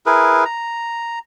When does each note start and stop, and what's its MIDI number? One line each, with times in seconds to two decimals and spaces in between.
0.06 0.44 64
0.06 0.44 68
0.06 0.44 70
0.06 0.44 71
0.45 1.19 82